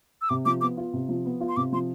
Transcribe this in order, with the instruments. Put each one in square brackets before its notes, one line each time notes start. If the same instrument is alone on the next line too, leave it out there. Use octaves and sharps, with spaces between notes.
[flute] E6
[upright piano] C3 [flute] D6
[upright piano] F3 [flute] D6
[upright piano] B3 [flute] D6
[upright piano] F4
C3
F3
B3
F4
[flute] C6
[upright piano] C3 [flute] D6
[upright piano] F3 [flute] C6